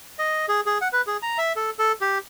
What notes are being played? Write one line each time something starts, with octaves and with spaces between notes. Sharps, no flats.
D#5
G#4
G#4
F#5
B4
G#4
A#5
E5
A4
A4
G4